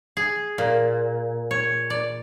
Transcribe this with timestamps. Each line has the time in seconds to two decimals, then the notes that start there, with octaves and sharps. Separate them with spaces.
0.17 G#4
0.58 A#2
1.51 C#5
1.90 D5